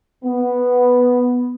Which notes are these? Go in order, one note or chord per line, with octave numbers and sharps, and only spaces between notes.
B3